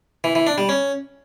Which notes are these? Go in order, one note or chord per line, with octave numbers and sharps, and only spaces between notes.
E3
E3
D4
G3
C#4